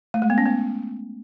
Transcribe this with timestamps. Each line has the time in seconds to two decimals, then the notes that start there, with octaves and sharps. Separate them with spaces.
0.14 A3
0.22 G#3
0.30 B3
0.38 C#4
0.46 B3